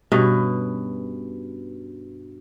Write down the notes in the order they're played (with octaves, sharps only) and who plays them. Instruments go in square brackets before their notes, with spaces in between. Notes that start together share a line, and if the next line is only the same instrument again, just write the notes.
[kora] G2 B2 C#4 B4